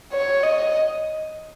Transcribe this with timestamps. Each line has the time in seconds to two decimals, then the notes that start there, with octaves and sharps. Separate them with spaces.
0.13 C#5
0.43 D#5